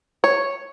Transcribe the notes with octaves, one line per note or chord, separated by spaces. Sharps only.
C#5